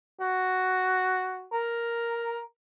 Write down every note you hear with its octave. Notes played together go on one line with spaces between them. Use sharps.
F#4
A#4